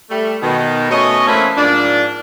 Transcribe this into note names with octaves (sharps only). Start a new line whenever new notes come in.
G3 A3
B2 D#3
B2 A3 C#4 C#5 D#5
E3 A3 A#3 C4 C#4 B5
G#2 F3 A#3 D4